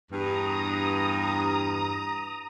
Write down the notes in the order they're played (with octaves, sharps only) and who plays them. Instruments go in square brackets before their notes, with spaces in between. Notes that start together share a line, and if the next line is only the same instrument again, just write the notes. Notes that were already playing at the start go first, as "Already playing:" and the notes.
[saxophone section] E2 G2 [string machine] A#5 D#6